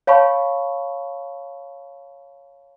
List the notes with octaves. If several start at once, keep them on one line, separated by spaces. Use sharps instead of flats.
C#5 F5 A5 B5 C#6